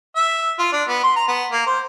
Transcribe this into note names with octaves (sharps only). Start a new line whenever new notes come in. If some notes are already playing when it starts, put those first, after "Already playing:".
E5
F4
D4
B3
C6
A#5
B3
A#3
C5